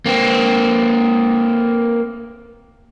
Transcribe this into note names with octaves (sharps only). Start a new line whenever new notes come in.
A#3 C4